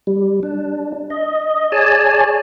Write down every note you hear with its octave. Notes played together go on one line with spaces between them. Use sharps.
G3
D4
D#5
G#4 C#5 D5 G#5 A5